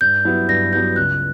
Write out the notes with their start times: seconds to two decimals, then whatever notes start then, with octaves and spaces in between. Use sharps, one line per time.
0.01 G2 G6
0.25 F#3 B3 E4 G4
0.48 G2 A#6
0.73 F#3 B3 E4 G4 G6
0.96 C#2 F#6